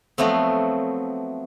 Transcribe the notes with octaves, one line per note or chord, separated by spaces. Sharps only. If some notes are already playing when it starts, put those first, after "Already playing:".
F3 F#3 A3 B3 C4